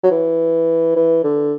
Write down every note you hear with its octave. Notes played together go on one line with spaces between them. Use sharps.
F#3
E3
E3
D3